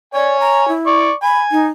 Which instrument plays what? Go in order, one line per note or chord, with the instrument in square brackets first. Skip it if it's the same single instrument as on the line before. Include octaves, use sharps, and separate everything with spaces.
[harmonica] C#5 G#5 [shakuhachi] D5
[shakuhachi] A#5
E4
[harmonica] D5 C#6
[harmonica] G#5 [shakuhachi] B5
[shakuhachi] D#4